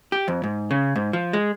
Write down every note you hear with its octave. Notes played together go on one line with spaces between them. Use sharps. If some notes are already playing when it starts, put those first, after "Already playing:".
G4
F2
G#2
C#3
G#2
F3
G#3